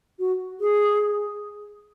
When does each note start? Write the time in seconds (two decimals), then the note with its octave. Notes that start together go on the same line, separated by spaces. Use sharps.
0.19 F#4
0.60 G#4